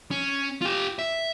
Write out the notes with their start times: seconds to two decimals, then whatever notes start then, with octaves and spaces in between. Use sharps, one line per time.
0.11 C#4
0.61 F4 G4
0.99 E5